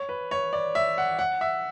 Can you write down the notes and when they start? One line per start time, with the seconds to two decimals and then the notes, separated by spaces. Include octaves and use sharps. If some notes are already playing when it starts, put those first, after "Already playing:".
Already playing: C#5
0.09 B4
0.31 C#5
0.53 D5
0.75 E5
0.98 F#5
1.19 F#5
1.41 E5